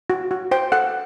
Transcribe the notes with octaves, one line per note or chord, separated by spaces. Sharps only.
F#4
F#4
C5 G5
A4 F#5